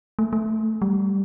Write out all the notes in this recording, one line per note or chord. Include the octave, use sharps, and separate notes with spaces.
A3
A3
G3